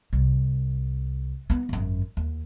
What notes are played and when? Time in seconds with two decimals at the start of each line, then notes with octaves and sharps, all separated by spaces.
0.13 C2
1.50 B3 D#4
1.69 G#1 F#2
2.17 D#2